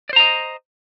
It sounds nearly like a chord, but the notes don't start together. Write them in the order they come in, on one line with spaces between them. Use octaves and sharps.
D5 C5 A#5 D#5